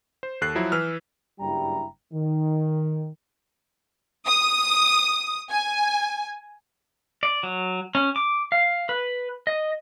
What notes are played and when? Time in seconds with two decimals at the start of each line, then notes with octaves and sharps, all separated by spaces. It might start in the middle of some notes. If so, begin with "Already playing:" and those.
0.23 C5
0.41 D#2 A4 F#6 C7
0.55 F3 F#3 E4
0.72 E3 B4 E6 F6
1.40 F#1 G2 G3 E4 G5 A#5
2.13 D#3
4.26 D#6
5.50 G#5
7.23 D5
7.43 F#3
7.95 C#4
8.16 D6
8.52 F5
8.89 B4
9.47 D#5